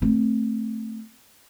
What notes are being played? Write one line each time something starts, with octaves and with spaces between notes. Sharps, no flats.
A3 C4